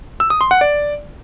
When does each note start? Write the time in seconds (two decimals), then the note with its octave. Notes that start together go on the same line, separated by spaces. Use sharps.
0.20 E6
0.30 D#6
0.41 C6
0.51 F#5
0.61 D5